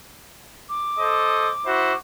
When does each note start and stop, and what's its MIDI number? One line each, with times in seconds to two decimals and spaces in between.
0.69 1.98 86
0.99 1.51 69
0.99 1.51 72
0.99 1.51 75
1.66 1.93 64
1.66 1.93 66
1.66 1.93 72